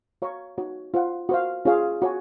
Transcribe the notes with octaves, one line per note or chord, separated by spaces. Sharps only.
F#4 C#5 F5 A#5 C#6
D#4 F#4 C#5
F4 C5 F#5
F#4 C5 F5
C#4 F4 G#4 C#5 F5
F#4 C#5 G#5